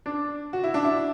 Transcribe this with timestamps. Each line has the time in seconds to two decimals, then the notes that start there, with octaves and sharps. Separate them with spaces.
0.06 D4
0.53 F#4
0.64 E4
0.74 D4
0.84 E4